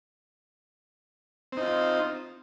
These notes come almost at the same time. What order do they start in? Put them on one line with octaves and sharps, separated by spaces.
C4 D#4 F4